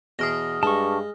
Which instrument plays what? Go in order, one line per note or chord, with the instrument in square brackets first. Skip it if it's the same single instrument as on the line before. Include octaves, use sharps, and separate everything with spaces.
[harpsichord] E2 B2 [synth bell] D#6 F6 A#6
[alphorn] G2 [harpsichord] G#3 [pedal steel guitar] A5 C#6